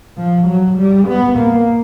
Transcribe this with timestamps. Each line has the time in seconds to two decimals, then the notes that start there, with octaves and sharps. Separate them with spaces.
0.17 F3
0.47 F#3
0.78 G3
1.08 B3
1.38 A#3